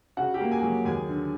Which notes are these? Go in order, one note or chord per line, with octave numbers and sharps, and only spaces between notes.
C#3 F#4 F#5
G4 G5
A#3
G#4 G#5
F#3
D#2 G#4 G#5
D3